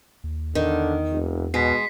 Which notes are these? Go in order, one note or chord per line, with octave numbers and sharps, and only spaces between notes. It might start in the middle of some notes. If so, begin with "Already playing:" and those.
D#2
E2 D3 D#3
F1
B2 G#3 B6 C7